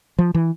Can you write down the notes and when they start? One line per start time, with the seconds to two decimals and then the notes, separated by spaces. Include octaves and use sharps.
0.19 F3
0.35 E3